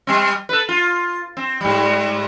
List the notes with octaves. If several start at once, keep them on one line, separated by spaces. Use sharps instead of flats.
G3 C4
A4 B4
F4
C4
G#2 G3